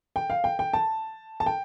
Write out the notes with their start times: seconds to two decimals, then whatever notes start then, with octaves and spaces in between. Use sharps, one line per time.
0.16 G5
0.30 F5
0.44 G5
0.59 G5
0.74 A5
1.40 A5
1.46 G5